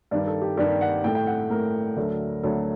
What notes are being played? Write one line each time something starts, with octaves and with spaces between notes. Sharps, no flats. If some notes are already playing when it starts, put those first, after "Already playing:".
G2 D#3 G3 D5
A4
G4
G2 D#3 G3 G4
F#5
A2 A3 G5
G5
F#5
A2 A3 A#4
D2 D3 F#3 A3
D2 D3 F#3 A3 A4